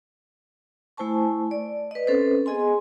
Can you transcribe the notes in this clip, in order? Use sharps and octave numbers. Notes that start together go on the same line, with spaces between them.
A3 E4 C5 G#5 A5 C#6
D5
B4 D#5
C4 C#4 A4 B4 C5
B3 G#4 D#5 G#5 C6